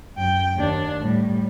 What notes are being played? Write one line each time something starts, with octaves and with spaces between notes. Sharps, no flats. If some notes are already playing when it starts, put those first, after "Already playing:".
F#2 G5
D#2 D4
A2 G3